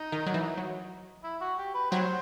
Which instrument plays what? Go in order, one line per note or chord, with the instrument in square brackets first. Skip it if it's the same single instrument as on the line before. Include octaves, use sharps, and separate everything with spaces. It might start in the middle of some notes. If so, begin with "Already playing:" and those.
Already playing: [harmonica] D#4
[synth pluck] D#3
F#3
E3
F#3
[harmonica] E4
F#4
G4
B4
[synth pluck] F#3 [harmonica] D#4 G4 C5